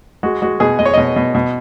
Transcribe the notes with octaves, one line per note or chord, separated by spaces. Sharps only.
G#3 F#4
G#3 F#4
B2 G#4
G#3 D#5
C#5
B2 D#5
B2
B2